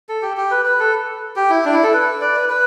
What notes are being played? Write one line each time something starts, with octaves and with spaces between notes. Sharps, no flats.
A4
G4
G4
B4
B4
A4
G4
E4
D4
E4
A4
B4
D5
B4
B4